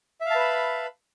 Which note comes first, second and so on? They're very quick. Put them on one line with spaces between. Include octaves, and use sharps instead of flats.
E5 F5 A5 B4 B5